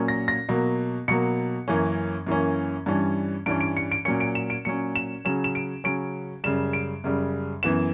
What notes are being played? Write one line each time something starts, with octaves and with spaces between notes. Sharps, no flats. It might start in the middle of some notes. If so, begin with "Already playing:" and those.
Already playing: A#2 F#3 A#3 C#4
A#6
A#6
B2 F#3 A#3
B2 F#3 A#3 C#7
F#2 E3 A#3 C#4
F#2 E3 A#3 C#4
G2 E3 G3 C#4
G2 E3 G3 C#4 D7
D7
C#7
D7
A#2 F#3 C#4 C#7
D7
E7
D7
A#2 F#3 C#4 C#7
E7
C#3 F#3 C#4 E7
E7
D7
C#3 F#3 C#4 D7
F#2 C#3 G3 E7
D7
F#2 C#3 G3
F#2 E3 B3 E7